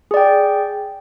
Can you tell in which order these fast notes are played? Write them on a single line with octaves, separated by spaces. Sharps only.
G#4 D5 G5